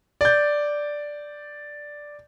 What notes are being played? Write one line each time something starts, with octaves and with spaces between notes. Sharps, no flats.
D5 G6